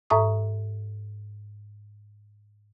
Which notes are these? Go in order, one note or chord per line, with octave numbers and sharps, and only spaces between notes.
G#2 A4 E5 A#5 C#6 D#6